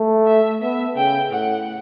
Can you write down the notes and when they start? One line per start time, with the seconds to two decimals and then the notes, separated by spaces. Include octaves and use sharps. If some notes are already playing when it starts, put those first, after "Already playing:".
Already playing: A3
0.27 E5
0.62 B3 E5
0.96 C#3 G5
1.31 A2 F#5